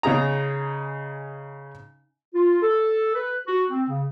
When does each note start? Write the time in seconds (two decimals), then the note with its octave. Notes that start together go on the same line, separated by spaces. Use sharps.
0.03 C#3 D#4 G#4 A#5
2.34 F4
2.62 A4
3.15 B4
3.47 F#4
3.70 C4
3.89 C#3